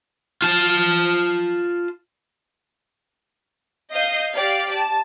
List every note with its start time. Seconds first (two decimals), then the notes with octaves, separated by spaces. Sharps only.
0.42 F4 A5
3.91 D#5 F5 D#6 G6 C7
4.33 G4 D5 F5
4.73 A5